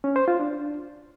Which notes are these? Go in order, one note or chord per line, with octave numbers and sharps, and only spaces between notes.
C#4
C5
F4
D4